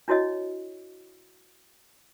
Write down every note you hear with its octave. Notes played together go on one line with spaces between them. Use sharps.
D4 E4 F#4 C#5 D#5